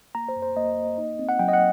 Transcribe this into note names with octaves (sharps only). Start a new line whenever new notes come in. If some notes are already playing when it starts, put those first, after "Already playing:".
A#3 A#5
C5
F#2
C5
A#3 D#5
A#3
D#4
C4
F#5
F#3 G5
D#5
F#5